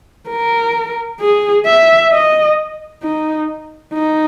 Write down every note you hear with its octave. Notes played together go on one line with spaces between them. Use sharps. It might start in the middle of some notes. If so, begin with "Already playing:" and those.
A#4
G#4
E5
D#5
D#4
D#4